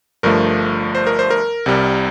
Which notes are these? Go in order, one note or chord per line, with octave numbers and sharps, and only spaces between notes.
G1 G2 F3 A3 A#4
C5
A#4
C5
A#4
C2 C3 G3